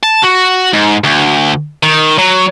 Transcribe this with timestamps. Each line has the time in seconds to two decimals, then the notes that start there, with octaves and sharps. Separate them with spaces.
0.03 A5
0.23 F#4
0.73 G#2
1.04 D2
1.83 D#3
2.18 F#3